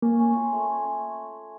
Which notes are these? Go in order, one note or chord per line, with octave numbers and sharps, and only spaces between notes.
A#3 C#4
C#4
F4
A3
C#4
C#4